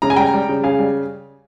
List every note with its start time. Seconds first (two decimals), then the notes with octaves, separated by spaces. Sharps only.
0.02 C#3 A#5
0.10 G#5
0.16 G3 G5 A#5
0.34 G3
0.49 C#3
0.64 C#3 F5 G#5
0.79 G3